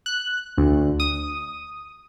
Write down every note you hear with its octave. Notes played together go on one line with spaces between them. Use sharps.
F#6
D2
D#6